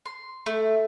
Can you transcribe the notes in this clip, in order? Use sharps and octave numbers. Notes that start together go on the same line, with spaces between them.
C6
A3